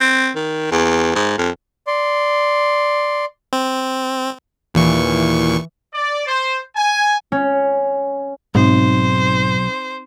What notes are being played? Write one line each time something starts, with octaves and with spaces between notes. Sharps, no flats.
C4
D#3
E2
G#2
F2
D5 C6
C4
D#2 A#2 E3 C#6
D5
C5
G#5
C#4
B1 G#2 C4 D#4 C5